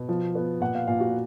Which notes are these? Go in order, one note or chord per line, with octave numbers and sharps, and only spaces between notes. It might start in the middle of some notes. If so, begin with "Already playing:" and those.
Already playing: B2
F3
B3
A#2 F#5
F5
A#2 F5
F#4